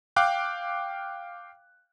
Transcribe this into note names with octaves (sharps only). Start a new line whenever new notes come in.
F5 G5 D6 F#6